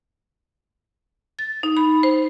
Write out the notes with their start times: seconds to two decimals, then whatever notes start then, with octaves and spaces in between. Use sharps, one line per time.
1.39 A6
1.63 D#4
1.77 B5
2.03 C5